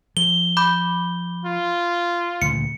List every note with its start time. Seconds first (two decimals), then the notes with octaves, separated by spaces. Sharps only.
0.17 F3 G7
0.57 B5 D6 G6
1.45 F4
2.42 D2 A#2 C#3 C#7